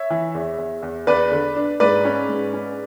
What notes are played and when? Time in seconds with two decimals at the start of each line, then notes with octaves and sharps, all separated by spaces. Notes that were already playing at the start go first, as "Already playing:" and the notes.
Already playing: C#5 E5
0.10 E3
0.35 E2
0.58 E2
0.83 E2
1.07 E2 B4 D5
1.32 D3
1.56 D4
1.80 G#2 B4 D5
2.05 C#4
2.29 G#2
2.54 C#4